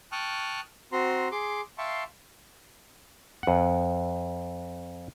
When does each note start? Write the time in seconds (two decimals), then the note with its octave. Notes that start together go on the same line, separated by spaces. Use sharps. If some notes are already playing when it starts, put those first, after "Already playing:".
0.12 G5 A5 C#6 D#6 F6 F#6
0.92 C4 F#4 A#5 C6
1.32 G#4 C6 D6
1.78 E5 F5 G5 A5 C6 C#6
3.43 F2 F#5